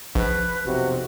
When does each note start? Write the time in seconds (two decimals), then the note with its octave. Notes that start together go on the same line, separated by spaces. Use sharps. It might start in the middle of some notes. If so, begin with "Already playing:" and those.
0.15 A#1 B4
0.66 B1 F2 C3 F#4